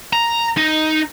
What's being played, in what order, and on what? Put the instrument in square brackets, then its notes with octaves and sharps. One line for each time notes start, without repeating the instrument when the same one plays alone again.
[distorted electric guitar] A#5
D#4